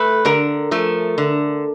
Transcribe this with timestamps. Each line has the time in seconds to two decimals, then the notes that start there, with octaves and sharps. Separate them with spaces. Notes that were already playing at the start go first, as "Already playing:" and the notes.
Already playing: A3 B4
0.25 D3 A#4
0.71 F3 A3
1.18 D3